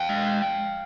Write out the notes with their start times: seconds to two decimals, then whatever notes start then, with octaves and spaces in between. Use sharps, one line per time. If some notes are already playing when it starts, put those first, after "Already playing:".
Already playing: F5 G5
0.09 G#3